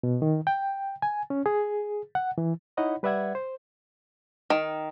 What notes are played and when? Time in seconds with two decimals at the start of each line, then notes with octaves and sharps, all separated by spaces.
0.03 B2
0.22 D#3
0.47 G5
1.02 G#5
1.30 C#4
1.46 G#4
2.15 F#5
2.38 E3
2.77 D#4 E4 C#5 D#5 F#5 B5
3.03 G3 B4 D5 E5 F#5 G#6
3.35 C5
4.50 D#3